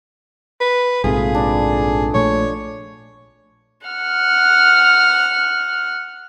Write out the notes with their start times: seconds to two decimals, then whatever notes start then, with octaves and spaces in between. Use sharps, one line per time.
0.61 B4
1.04 A#1 G#2 C3 A3 F4 G#4
1.35 D4 B4
2.14 A#1 A#2 A3 C#5
3.87 F#5 F6